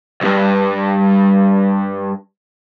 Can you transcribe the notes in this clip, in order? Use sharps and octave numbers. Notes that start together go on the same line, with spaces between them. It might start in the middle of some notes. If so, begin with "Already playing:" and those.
C2 G2